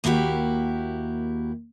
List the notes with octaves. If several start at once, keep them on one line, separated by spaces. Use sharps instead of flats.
D#2 A#3 E4 F#4 G4